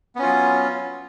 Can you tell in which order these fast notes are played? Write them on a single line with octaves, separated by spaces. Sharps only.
B3 C#4 F4 F#3